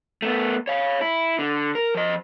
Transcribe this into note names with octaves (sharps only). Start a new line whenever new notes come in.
A3 B3
C#5 F5
E4
D3
A#4
F3 D#5